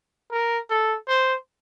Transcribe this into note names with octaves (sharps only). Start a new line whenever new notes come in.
A#4
A4
C5